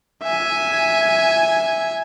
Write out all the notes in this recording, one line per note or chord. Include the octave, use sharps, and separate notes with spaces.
E5 G#5